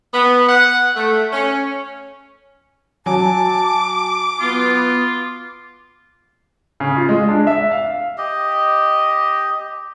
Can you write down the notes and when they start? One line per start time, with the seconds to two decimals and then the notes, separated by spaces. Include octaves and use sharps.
0.14 B3
0.49 F#5
0.96 A3
1.32 C#4
3.06 F#3 G#5 A5 D6
4.40 B3 F4
6.80 C#3
6.97 F4
7.09 G#3
7.28 D4
7.47 E5
7.71 F5
8.18 G4 D#5